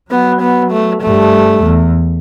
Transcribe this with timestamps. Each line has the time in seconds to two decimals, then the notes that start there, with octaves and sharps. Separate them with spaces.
0.11 F#3 B3
0.41 B3
0.71 A3
1.02 G2 A3
1.63 E2